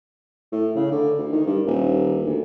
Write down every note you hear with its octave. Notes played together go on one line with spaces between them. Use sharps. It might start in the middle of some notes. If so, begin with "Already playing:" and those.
A2
C#3
D3
D2
D#3
G2
D#1
D2